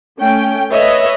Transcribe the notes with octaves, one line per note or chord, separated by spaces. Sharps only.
A3 C#4 G5
A4 B4 C#5 D#5 E5